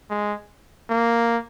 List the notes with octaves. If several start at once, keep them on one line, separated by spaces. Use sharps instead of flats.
G#3
A#3